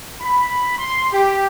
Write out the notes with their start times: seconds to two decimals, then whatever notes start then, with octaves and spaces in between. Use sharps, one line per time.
0.21 B5
0.79 C6
1.13 G4